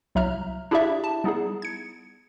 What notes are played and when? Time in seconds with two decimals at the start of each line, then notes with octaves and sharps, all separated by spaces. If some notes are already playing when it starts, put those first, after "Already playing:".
0.15 C2 F#3 E5 A#5 F6
0.71 D4 E4 G4 G#4 D5 E5
1.04 A5
1.24 G3 B3 D#4 E4 G#4
1.62 G#6 C#7